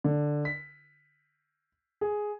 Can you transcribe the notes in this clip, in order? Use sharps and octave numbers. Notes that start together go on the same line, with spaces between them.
D3
B6
G#4